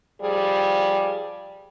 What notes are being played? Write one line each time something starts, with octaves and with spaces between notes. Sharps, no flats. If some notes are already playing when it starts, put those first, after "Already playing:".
F3 G3 G4 G#4